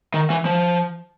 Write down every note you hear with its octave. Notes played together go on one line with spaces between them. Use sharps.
D#3
E3
F3